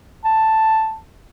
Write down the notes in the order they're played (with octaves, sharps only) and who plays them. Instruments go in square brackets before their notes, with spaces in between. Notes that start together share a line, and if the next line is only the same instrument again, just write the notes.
[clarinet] A5